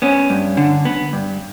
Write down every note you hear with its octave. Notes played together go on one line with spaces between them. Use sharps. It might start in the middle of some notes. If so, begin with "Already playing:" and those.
B3 C#4
G2
D3
B3
G2